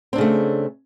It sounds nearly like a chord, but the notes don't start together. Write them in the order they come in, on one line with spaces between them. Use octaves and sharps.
C4 D4 C#3 A3